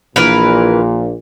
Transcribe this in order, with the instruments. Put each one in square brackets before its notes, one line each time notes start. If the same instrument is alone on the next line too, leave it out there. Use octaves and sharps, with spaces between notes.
[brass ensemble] A#1 A#2 [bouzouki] E3 A#4 B4